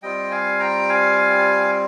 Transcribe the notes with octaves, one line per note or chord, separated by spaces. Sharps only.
G3 C4 F4 D#5 G5
F5 G#5
G5 A#5
F5 G#5